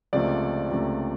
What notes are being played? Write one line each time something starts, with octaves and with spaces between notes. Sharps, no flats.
C#2 C3 F3 A3 D5
C#2 C3 F3 A3